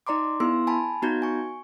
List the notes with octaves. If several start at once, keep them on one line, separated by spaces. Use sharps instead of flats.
D#4 D5 A#5 C6 D6
B3 E4 G#4 C6 E6
G#5 A5 B5
B3 D#4 F#4 A#5 G6 G#6
G#5 C#6